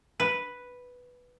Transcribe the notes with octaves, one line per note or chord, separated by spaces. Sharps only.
B4